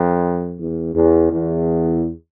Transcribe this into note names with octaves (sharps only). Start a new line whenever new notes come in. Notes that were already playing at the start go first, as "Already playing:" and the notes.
Already playing: F2
E2
E2
E2